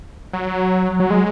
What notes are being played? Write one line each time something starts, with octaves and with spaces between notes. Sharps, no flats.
F#3
F#3
G#3